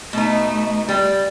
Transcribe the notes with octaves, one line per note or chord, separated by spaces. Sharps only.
B2 A3 D#4
G3